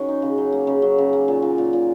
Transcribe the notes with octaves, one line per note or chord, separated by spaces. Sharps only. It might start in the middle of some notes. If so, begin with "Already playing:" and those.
Already playing: D#3 C#4 F#4
D#4
C#3
F#3
A#3
C#3
F#3
C#3
A#3
A#2
A#2
A#2
A#2